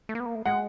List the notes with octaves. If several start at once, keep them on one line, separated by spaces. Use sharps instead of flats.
A3
A#3
B3
A#3
A3
G#3 F#5